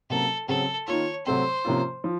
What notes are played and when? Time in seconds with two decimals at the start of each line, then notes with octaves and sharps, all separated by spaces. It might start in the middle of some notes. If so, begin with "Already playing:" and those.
0.10 C3 F#3 A#3 C#4 A4
0.48 C#3 F#3 C4 A4
0.87 D#3 A#3 F4 C#5
1.26 C3 F#3 A3 C4 C5
1.65 C3 F3 A#3 C#4 F4
2.04 F3